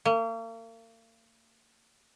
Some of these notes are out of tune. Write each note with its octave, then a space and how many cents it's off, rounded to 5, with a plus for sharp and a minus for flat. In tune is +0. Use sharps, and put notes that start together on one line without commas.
A#3 -40